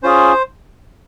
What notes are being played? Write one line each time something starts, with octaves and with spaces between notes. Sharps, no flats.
C#4 F4 G#4 C5